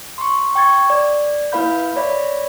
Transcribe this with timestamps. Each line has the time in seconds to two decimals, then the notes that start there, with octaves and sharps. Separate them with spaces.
0.18 C6 C#6
0.55 G5 C#6 G#6 A6
0.90 D5
1.52 A#3 E4 B4 F5 B5 G6
1.96 C#5 D5 E5 B5